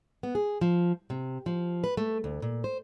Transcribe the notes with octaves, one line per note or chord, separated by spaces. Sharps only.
B3
G#4
F3
C3
F3
B4
A3
D2
A#2
C5